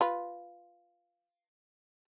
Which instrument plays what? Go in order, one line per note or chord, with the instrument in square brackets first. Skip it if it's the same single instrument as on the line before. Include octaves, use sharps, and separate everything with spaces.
[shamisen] F4 B4